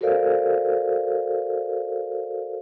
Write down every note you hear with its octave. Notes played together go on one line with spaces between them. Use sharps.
F#4 A4 A#4 C5 D5 F5